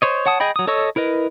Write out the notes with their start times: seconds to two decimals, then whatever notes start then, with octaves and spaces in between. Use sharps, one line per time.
0.02 C5 C#5 D#5
0.26 C#5 F#5 A5 D#6
0.40 G#4 D#5 G5 B5
0.56 F#3 D#6
0.67 A4 C#5 D#5 C#6 E6
0.96 E4 A#4 B4 D#5